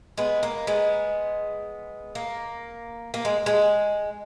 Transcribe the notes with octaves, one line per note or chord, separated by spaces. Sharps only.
G#3 B3
A#3
G#3 B3
A#3
A#3
G#3
G#3